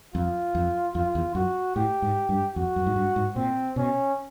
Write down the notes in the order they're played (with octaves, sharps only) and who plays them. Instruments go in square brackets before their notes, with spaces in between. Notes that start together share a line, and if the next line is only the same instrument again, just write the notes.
[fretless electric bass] F2 [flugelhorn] F4
[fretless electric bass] F2
[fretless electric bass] F2 [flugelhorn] F4
[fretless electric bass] E2
[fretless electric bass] F#2 [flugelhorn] F#4
[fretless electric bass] A2 [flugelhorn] G4
[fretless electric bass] G#2
G2
[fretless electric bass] F2 [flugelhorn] F#4
[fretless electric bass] F#2
G#2
G2
G#2
[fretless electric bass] A#2 [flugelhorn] C4
[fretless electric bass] B2 [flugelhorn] C#4